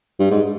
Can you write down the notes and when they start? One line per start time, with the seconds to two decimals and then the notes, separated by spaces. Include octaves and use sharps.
0.20 G2
0.31 G#2